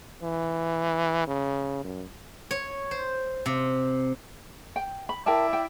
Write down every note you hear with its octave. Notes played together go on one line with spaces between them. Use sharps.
E3
C#3
F#2
C#5
C5
C3
G5
B5
E4 A#4 D5 E5 G5 A5
G5